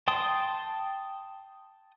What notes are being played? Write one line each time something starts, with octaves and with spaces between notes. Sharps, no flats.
G5 A5 C6 D#6